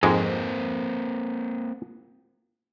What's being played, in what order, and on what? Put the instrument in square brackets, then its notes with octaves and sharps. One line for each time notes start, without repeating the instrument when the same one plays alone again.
[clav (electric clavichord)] F2 G#2 G#3 [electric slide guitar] A#3 C4